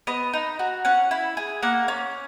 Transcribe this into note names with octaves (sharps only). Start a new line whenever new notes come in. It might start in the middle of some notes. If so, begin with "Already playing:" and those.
B3 D#5
D#4
F#4
C#4 F#5
E4
G#4
A#3 F#5
C#4